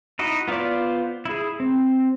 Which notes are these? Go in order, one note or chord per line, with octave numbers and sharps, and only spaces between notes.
D#4 E4 F#4 D#5
B3 F4 C5 D5 D6
E4 G#4
C4